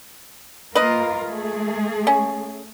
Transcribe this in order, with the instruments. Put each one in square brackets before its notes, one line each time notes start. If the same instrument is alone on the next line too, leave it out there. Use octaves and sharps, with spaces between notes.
[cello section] A#3 F4 A#4 [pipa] B4 D#5
[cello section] A3 G#4
[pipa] C#4